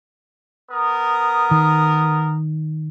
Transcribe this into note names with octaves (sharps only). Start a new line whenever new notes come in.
B3 A#4 D#6
D#3